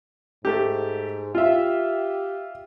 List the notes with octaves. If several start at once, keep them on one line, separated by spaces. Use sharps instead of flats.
G#2 A3 G4
F4 G4 E5